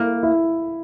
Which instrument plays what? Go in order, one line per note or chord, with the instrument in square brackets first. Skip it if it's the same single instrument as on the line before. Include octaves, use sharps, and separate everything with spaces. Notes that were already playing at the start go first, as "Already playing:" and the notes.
Already playing: [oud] A#3 [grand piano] E4
[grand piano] E4